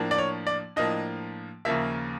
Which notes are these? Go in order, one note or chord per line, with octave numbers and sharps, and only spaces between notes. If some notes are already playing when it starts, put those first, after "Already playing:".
Already playing: A2 F3 A#3 D4
D5
C#5
D5
A2 F3 A#3 D4 D#5
D#2 C#3 F3 A#3 E5